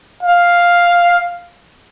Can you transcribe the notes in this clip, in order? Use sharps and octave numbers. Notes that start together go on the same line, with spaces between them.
F5